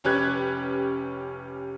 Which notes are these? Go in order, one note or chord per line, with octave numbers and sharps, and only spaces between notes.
F1 C#4 G4 B4 F#6 G#6